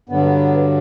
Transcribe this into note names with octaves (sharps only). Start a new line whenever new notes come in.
G2 D3 F#3 B3